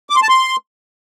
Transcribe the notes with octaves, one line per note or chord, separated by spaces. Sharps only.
D6
C6
A5
C6